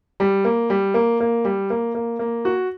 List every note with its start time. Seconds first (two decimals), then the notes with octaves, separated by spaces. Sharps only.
0.20 G3
0.45 A#3
0.70 G3
0.94 A#3
1.20 A#3
1.45 G3
1.70 A#3
1.95 A#3
2.19 A#3
2.45 F#4